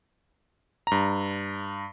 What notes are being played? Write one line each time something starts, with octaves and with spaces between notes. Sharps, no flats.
G2 A#5